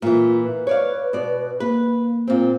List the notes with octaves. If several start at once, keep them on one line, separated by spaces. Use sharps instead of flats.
A#2 E3 F4
B4
C#5 D5 F5
B2 D5
A#3 B4
A#2 C4